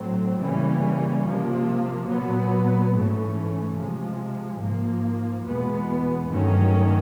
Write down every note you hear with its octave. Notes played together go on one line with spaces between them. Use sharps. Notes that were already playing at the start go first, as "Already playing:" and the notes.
Already playing: A2 F#3 A3 C4
C#3 E3 G3 A#3 C#4
C3 F3 A#3
A#2 F#3 B3
G#2 E3 A3 C#4
C3 F3 G#3
G#2 F3 A#3
E2 B2 G#3 B3
G2 D#3 F#3 A3 C#4